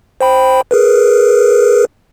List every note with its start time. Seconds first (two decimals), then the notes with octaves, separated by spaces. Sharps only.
0.21 C5 G5 B5
0.71 G#4 A#4 B4